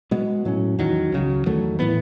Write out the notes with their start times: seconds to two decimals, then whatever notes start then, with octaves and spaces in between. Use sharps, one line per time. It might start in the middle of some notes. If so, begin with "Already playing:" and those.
0.11 B2 G#3 B3
0.45 A2 F#3 C#4
0.79 E2 D#3 F#3
1.12 C#2 C#3 F#3
1.46 E2 D#3 F#3 A3
1.79 A2 E3 B3